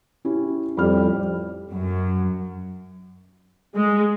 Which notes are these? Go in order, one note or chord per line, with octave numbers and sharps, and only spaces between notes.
C#4 E4 G4
F2 A2 G3 B5 F6
F#2
G#3